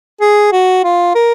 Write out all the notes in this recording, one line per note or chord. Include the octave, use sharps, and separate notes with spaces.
G#4
F#4
F4
A#4